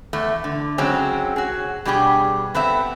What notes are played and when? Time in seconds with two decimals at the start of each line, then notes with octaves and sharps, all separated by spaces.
0.13 E2 A3
0.44 D3
0.78 C#3 F#3 G#3 C4 C#4
1.36 F#4 G#4
1.85 B2 G3 D4 G4 G#4
2.55 B3 C4 A4 E5